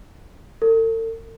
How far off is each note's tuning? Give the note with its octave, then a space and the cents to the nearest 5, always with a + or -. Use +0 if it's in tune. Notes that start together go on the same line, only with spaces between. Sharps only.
A4 +45